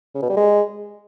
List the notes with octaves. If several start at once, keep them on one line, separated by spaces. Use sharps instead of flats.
C#3
B2
G3
G#3